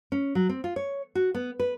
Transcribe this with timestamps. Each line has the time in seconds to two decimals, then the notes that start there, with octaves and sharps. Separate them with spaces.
0.12 C#4
0.35 F#3
0.49 C4
0.64 F4
0.76 C#5
1.15 F#4
1.35 B3
1.60 B4